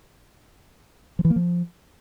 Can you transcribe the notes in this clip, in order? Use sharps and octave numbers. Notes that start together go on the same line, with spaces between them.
F3
E3
A#3
F3